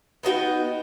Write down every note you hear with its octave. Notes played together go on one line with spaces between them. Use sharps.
B3 D#4 F#4 G5